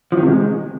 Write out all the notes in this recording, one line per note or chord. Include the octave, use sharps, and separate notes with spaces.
F3
D#3
C3
G#3